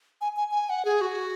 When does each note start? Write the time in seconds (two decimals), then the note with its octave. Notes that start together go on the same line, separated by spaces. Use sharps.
0.21 G#5
0.37 G#5
0.51 G#5
0.70 F#5
0.85 G#4
1.01 F#4